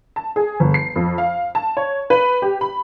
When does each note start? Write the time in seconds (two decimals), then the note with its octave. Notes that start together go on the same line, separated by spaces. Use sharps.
0.16 A5
0.36 G#4
0.60 G1
0.74 C7
0.96 F2
1.18 F5
1.55 A5
1.77 C#5
2.10 B4
2.42 G4
2.61 B5